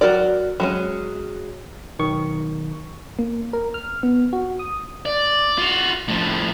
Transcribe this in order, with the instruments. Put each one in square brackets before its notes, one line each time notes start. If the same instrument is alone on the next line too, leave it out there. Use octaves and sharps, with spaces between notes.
[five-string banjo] F#3 F#4 A#4 D5
F#3 G#3 C#4
[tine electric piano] B1 D#3 C#6
[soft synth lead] A#3
A#4
F6
B3
F#4
D#6
[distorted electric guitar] D5
F4 F#4
A2 F3